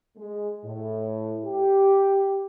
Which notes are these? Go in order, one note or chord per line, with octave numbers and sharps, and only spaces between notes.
G#3
A2
G4